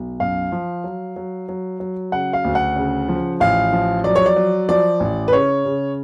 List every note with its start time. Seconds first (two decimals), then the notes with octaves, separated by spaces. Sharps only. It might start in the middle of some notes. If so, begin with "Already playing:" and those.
Already playing: B1
0.20 F#2 F5
0.52 F3
0.84 F#3
1.16 F#3
1.49 F#3
1.80 F#3
2.12 C#3 F#5
2.33 F5
2.44 D2
2.55 F#5
2.76 C#3
3.09 F3
3.40 A1 F5
3.73 F3
4.04 F#3 D5
4.16 C#5
4.26 D5
4.36 F#3
4.69 F3 D5
5.00 A1
5.28 B4
5.33 C#3 C#5
5.65 C#3